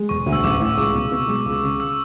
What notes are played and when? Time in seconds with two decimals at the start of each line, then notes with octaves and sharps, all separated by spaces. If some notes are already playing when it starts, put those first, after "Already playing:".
Already playing: G#3
0.09 E1 C#6
0.26 D2
0.32 E6
0.44 A1 D6
0.60 A2
0.77 C#2 D6
0.95 B2
1.12 B2
1.28 G#3
1.46 C#2
1.63 C#3
1.80 E6